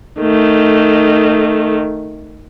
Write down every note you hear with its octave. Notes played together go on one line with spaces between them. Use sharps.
D#3 A3